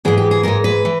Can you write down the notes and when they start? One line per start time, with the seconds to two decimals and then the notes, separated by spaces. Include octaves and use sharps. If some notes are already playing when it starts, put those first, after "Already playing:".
0.05 G#2 E3 G#3 G#4
0.18 G4
0.31 G#4
0.43 G#2 E3 G#3 A#4
0.64 B4
0.85 E3